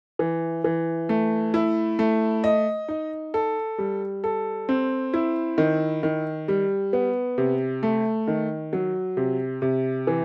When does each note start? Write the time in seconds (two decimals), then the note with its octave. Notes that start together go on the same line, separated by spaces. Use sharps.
0.19 E3
0.64 E3
1.09 A3
1.54 E4
1.99 A3
2.44 D#5
2.88 D#4
3.34 A4
3.78 G3
4.24 A4
4.69 C4
5.14 E4
5.58 D#3
6.03 D#3
6.48 G3
6.93 B3
7.38 C3
7.83 A3
8.28 D#3
8.73 F#3
9.17 C3
9.62 C3
10.07 E3